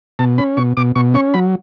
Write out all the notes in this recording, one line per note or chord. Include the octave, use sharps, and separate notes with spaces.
B2 A5
C#4 B5
B2 C#6
B2 D6
B2 C#6
C#4 C#6
F#3 B5